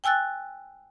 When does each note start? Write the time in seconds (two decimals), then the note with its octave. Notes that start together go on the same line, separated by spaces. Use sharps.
0.04 G5 G#5 E6 F#6 A6